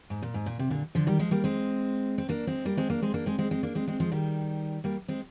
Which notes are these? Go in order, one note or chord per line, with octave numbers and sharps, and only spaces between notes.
G#2
A#2
G#2
A#2
C3
A#2 D3
D3 F3
D#3 G3
F3 G#3
G3 A#3
G#3 C4
C4
A#3 D4
G#3 C4
G3 A#3
G#3 C4
A#3 D4
G#3 C4
A#3 D4
G#3 C4
G#3 C4
G#3 C4
A#3 D4
G#3 C4
G#3 C4
F3 G#3
D#3 G3
G3 A#3
G#3 C4